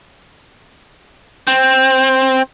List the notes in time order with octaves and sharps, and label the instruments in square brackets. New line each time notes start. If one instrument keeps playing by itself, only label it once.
[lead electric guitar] C4